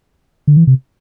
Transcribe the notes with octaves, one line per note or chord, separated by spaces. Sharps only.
D3
E3
C3